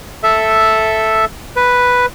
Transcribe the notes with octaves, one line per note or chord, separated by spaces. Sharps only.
A4 E5
B4